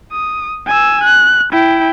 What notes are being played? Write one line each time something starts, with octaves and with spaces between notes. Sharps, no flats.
D#6
G#5 E6
F#6
E4 G5